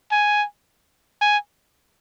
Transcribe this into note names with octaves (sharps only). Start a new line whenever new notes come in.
G#5
G#5